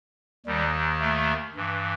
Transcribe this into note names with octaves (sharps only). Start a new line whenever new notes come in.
D#2 D#3 G3
A3
G2 E3